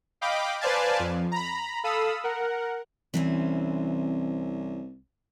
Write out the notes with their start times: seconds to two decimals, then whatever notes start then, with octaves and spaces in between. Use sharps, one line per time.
0.21 D#5 F5 G5 B5 D6
0.61 B4 C5 D5 F5 G#5 A5
0.99 F2
1.32 A#5 B5
1.84 A4 F5 B5 D#6 E6
2.24 A#4 F#5
3.14 C2 E3 C4 C#4